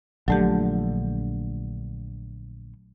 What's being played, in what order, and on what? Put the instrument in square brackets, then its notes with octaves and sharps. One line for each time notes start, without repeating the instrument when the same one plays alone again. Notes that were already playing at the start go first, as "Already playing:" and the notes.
[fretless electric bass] A#1 D3 [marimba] F#3 A3 G4